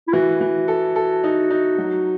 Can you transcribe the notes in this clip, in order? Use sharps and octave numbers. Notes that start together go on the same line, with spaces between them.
E4
E3 F#4
E3
A4
A4
D#4
D#4
F#3